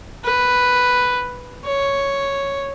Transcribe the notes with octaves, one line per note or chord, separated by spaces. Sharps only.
B4
C#5